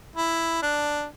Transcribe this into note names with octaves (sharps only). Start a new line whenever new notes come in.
E4
D4